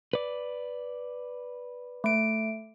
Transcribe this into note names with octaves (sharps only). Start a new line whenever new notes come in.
B4 D5
A3 D7